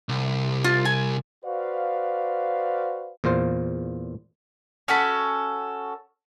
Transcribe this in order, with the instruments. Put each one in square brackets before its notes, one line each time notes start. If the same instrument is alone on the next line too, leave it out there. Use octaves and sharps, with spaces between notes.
[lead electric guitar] C2
[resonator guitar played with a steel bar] F4
G#5
[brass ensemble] F#4 B4 C5 D5 F5
[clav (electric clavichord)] E2 A#2 F4 C5
[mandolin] C#4 F#4 A4 B5